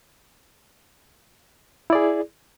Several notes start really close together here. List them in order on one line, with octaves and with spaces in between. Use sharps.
E4 D5 G#4